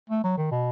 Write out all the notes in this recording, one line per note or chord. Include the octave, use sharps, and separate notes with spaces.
A3
F#3
D#3
B2